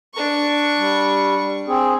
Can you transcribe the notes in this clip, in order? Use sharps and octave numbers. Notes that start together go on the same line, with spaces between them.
D4 C#6
G3
C4 G#4